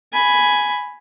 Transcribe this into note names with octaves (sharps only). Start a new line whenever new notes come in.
G#5 B5